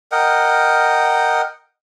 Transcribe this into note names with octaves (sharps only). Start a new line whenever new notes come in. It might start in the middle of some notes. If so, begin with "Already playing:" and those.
A#4 D#5 F#5 G5